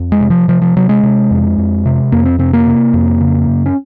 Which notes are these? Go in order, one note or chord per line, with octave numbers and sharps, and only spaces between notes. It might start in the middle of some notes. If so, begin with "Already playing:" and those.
Already playing: F2
G#3
C3
F3
C3 F3
F3
C3 F#3
G#3
C3
F2
F2
C3
F2 A#3
C4
C3 C4
A#3
C3
F2
C#3
F#2
C#4